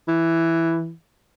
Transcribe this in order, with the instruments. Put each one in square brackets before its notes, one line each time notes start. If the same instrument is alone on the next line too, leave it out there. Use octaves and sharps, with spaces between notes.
[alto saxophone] E3